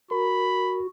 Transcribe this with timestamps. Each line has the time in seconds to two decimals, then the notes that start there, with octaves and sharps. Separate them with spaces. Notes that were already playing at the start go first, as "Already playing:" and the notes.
0.11 F#4 A#4 B5